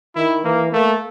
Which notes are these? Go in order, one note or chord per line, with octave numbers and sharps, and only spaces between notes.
D#3 E4
E3 A#3
A3 A#3